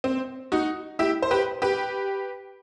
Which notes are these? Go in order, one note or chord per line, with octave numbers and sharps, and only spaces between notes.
C4
D#4 F#4
E4 G4
C5
G4 B4
G4 B4